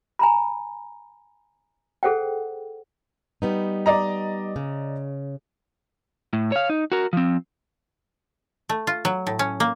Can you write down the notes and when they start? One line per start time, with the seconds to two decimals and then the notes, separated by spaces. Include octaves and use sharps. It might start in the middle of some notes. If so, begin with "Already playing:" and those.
0.19 G#5 A#5 B5
2.03 G#4 A4 C5 F#5 G5
3.42 G3 B3 D#4
3.86 D5 D#5 A#5
4.56 C#3
6.33 A2
6.52 C#5 F5
6.70 D#4
6.92 F#4 A#4
7.13 F3 C4
8.69 A3
8.87 F4
9.05 F#3
9.27 A2
9.39 C#4
9.60 A#3